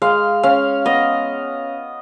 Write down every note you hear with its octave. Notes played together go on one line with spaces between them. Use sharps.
G#3 F5
C#4 F5
B3 D#5